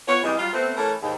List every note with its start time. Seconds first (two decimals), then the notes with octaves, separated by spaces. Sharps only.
0.08 B3 F4 C#5
0.23 C3 E3 G3 G#3
0.38 F#3 G3 F4
0.53 A3 B3 C4
0.77 E3 A3 C#4 A4 A#4
1.02 D#2 G#2